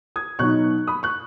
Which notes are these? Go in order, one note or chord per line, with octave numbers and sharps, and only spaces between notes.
D#6 G#6
B2 F#3 B3 D#4 C#6 F#6
B5 D#6
C#6 F#6